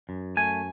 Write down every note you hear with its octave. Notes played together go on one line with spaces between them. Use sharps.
F#2
A3 G#5